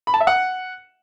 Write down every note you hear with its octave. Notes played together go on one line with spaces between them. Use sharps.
B5
A5
E5
F#5